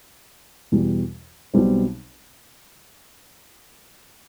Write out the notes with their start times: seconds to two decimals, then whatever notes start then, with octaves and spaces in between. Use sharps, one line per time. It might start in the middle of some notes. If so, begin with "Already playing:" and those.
0.72 E2 B2 G3
1.54 B1 B2 G3 C4